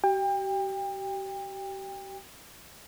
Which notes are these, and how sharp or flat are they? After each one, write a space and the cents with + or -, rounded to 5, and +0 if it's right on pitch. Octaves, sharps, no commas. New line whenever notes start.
G4 -40 G5 +30